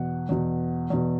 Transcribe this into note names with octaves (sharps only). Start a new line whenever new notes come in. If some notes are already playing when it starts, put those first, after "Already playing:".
Already playing: E2 B2 F#5
E2 B2
E2 B2